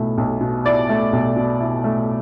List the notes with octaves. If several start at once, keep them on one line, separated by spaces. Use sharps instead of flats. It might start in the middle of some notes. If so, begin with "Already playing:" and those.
Already playing: B1 B2 A3 E4
B1
B2
E4 D5
A3
B1
B2
E4
A3